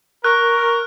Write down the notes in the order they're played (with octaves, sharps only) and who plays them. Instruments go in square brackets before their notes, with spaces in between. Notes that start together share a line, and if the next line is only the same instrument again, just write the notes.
[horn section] A#4 [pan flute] C#6 [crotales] F#6